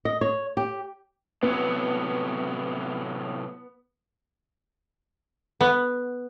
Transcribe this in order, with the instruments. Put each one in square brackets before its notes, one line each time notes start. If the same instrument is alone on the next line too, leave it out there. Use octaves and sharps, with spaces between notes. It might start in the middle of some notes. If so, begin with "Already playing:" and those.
[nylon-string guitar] D#5
C#5
G4
[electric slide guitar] A2 C3 F#3 [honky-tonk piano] B3
[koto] B3